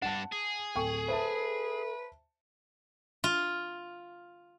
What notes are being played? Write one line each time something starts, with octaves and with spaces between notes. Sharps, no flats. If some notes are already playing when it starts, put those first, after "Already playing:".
G2 D4 F#5 A5
G#4
D1 A4 G5 C#6
B4 C5 E5 A5
F4